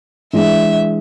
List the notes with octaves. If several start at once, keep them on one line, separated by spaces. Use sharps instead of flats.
E3 G#3 D4 G#4 E5